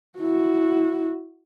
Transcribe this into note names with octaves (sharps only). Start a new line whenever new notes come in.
E4 F#4